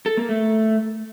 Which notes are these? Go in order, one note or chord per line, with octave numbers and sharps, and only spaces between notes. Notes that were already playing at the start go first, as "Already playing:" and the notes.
A4
A#3
A3